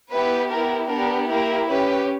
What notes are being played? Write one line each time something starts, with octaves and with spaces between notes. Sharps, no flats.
B3 E4 G4 B4
B3 E4 G4 A#4
B3 D4 G4 A#4
A#3 E4 G4 A#4
C#4 G4 B4